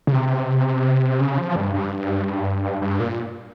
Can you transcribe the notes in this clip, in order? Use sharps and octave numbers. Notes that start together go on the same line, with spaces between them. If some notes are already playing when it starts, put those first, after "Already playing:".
C#3
C3
C#3
F3
G2
G2
G2
A#2